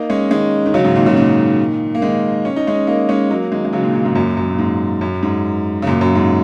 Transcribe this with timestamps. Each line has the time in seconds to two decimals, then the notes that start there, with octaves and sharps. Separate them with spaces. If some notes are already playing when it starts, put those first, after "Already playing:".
Already playing: A#3 D#4
0.10 G#3 C#4
0.31 D#3 G#3
0.66 D#3
0.74 C#3 F#3
0.84 G#2 C#3
0.95 A#2 D#3
1.06 C#3 F#3
1.17 A#2 D#3
1.95 A#3
2.02 D#3 G#3
2.45 C#4
2.56 D#4
2.67 G#3 C#4
2.87 A#3 D#4
3.09 G#3 C#4
3.30 F#3 A#3
3.51 D#3 G#3
3.65 G#3
3.73 C#3 F#3
3.83 A#2 D#3
3.94 A#2 D#3
4.05 G#2 C#3
4.15 F#2 A#2
4.37 F#2
4.50 A#2
4.58 G#2
5.01 F#2
5.23 G#2
5.82 C#3
5.87 F#2 A#2
6.01 F#2
6.15 G#2